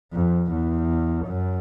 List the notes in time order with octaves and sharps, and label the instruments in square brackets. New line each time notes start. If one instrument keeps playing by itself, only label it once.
[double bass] F2
E2
F#2